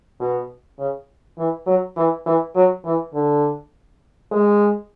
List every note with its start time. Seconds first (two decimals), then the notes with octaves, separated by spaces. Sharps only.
0.20 B2
0.79 C#3
1.38 E3
1.67 F#3
1.96 E3
2.26 E3
2.55 F#3
2.85 E3
3.14 D3
4.31 G#3